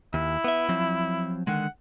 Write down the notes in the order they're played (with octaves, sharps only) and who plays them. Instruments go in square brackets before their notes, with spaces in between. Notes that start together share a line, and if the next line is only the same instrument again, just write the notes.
[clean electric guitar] D#2 [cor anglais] E4
[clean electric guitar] B3 E5
F3 F#3 C4
[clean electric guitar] D3 D#3 G#3 [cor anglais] F#5